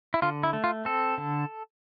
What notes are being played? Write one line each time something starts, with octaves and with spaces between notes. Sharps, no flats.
E4
D3 F4
E4
A3
F4
C4 A4
D3